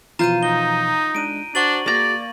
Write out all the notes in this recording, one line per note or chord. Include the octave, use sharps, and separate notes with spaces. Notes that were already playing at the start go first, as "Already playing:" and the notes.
B2 E3 F3 F4 A#5 G6 D#7
D#4 G7
G#3 D4 F#6 D7 D#7
D4 F#4 C5 F#5 C#6 A6 F#7
A#3 F#4 G#4 D5 A#5